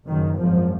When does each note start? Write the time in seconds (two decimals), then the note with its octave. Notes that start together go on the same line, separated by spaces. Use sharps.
0.08 F#1 F#2 D#3
0.39 G#1 F#2 F3